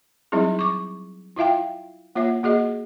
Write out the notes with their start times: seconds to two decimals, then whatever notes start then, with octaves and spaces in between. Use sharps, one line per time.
0.32 F#3 G3 C4 D#4 E4 G#4
0.59 C#6 D6
1.36 E4 F4 E5 F5 G5
2.15 A#3 F4 C#5 E5
2.43 A#3 F#4 G#4 D#5